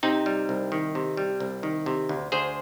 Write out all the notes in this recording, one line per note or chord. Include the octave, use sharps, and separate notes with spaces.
C3 C4 D#4
G3
C2
D#3
C3
G3
C2
D#3
C3
D2
D2 G#4 C5